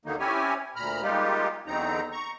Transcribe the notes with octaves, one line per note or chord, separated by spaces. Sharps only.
D#2 D3 D#3 F#3 A#3 D#4
C4 C#4 E4 G4 C#5 G#5
D2 A#2 A#5 B5 F6
G3 G#3 A#3 D#4 F4 G4
E2 D3 F#3 C4 D#4 A#5
A#5 C#6